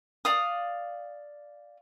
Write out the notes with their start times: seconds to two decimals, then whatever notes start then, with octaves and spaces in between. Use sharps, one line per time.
0.25 D5 F5 D#6